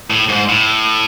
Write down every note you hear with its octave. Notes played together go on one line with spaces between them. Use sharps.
A2
G#2
A2